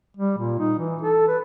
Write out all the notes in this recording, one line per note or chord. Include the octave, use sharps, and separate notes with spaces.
G3
A#2
D#4
E3
A4
B4